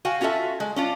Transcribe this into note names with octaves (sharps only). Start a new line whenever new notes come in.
F#4 F5 G5 G#5
C#4 F4 F#4 A4 E5
G#3
C#4 D4 F4